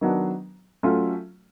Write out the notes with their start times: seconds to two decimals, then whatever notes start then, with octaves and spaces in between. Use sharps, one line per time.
0.01 D#3 F#3 B3 D4
0.83 F#3 A3 C#4 F4